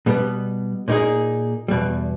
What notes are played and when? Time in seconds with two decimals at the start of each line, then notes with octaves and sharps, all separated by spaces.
0.06 B2 G3 B3
0.88 A#2 A#3 D#4 G#4
1.68 E2 B2 G3